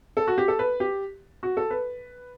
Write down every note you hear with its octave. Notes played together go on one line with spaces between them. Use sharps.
A4
F#4
G4
A4
B4
G4
F#4
A4
B4